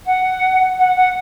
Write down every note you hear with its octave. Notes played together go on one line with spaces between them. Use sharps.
F#5
F#5
F#5